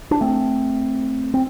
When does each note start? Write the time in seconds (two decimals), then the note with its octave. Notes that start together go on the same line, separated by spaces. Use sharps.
0.11 D4
0.21 A3 C4
1.34 C4